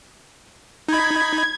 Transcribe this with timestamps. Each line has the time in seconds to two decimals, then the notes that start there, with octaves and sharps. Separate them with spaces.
0.88 D#4 B5 G#6